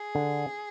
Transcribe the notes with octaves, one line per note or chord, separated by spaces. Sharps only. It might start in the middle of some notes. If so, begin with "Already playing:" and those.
Already playing: G#4
D3